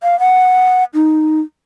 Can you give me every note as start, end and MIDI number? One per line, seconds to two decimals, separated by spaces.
0.03 0.19 77
0.20 0.84 78
0.94 1.40 63